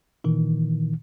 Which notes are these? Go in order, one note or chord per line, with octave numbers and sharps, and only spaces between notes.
A#2 D#3 E3